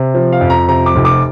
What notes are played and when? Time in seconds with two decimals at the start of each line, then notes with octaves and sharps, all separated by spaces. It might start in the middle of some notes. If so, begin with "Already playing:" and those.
Already playing: C3
0.14 F3
0.33 F5
0.41 F2
0.50 A#5
0.68 C3 A#5
0.86 D6
0.95 F1
1.05 D6